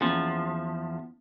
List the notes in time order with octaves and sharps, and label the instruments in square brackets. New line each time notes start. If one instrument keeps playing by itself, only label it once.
[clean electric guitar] E2 F3 [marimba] A#3 B3 C#4